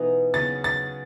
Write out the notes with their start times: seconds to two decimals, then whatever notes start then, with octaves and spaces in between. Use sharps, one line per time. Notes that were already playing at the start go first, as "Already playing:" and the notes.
Already playing: B2 E3 B3 D#4
0.34 C#3 F#3 B3 A6
0.64 A6